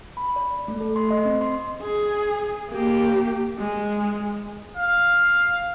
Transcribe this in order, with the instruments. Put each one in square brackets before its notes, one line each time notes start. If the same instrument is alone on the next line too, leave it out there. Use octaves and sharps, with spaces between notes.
[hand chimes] B5
D5
A3
A4
C6
D#5
C4
C6
[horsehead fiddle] G#4
A#3 G4
G#3
[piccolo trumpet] F5